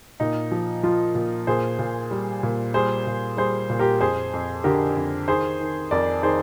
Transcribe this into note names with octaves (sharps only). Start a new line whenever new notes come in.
A#2 D#4
F3
F3 F4
A#2
A#2 G#4 C5
A#2
G3
A#2
G3 G#4 C5
A#2
G3 G#4 C5
A#2
G4 A#4
F2 G#4 C5
F2
D3 G4 A#4
F2
D#3 G#4 C5
D#3
F2 A#4 D5
D#3 G#4 C5